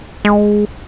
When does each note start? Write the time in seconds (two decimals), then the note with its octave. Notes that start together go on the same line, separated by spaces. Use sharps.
0.25 G#3